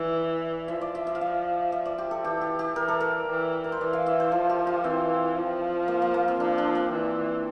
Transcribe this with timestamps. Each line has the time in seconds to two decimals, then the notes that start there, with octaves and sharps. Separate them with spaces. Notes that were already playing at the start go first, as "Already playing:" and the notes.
Already playing: E3 D5
0.68 F3 E5
0.81 D5
0.95 E5
1.07 E5
1.15 F5
1.21 E5
1.72 E5
1.86 D5
1.98 G4
2.11 A4
2.24 E3 G4
2.41 G4
2.59 G4
2.76 E3 A#4
2.88 A4
3.01 A#4
3.28 E3
3.64 A#4
3.72 C5
3.81 E3 D5
3.93 F5
4.06 E5
4.20 C5
4.32 F3 A4
4.50 G4
4.67 F4
4.84 E3 C4
5.37 F3
5.88 A#3
6.02 A#3
6.14 A#3
6.28 C4
6.40 F3 D4
6.58 D4
6.75 C4
6.92 E3